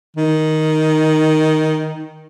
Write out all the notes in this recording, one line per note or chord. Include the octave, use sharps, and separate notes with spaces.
D#3